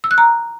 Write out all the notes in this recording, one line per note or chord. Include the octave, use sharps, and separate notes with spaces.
E6
F#6
A#5